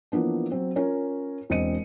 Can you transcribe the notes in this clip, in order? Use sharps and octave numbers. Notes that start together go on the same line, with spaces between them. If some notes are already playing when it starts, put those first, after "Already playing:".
E3 F3 A#3 B3 D4
F#3 C4
C#4 F4 A#4 C#5
E1 C4 D4 D#5 C#7 D#7